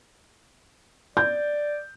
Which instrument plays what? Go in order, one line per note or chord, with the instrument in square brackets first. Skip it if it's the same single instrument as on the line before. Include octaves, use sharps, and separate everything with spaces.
[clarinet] D5 [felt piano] G6